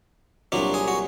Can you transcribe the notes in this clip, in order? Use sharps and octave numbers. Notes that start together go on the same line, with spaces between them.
C2 A#2 F#3 D4
G#4
F#4